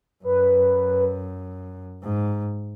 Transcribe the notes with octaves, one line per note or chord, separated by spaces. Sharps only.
F#2 B4
G#2